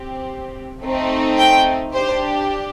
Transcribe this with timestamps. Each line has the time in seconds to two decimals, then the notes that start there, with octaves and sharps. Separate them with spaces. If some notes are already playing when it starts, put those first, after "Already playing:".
Already playing: C4 G4
0.83 A3 C4 D#4
1.38 G5
1.94 D4 G4 C5